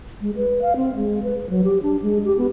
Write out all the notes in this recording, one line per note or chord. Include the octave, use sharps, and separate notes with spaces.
G#3
B4
F5
C4
G#3
B4
F#3
G4
D4
G#3
G4
B3